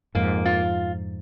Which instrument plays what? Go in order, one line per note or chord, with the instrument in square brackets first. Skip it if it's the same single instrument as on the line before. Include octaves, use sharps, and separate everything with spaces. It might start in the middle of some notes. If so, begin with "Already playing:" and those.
[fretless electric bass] F2 G#2 [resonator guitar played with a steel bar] A#3
[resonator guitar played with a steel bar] F4